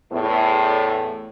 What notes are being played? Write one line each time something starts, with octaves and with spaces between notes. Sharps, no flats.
E2 A2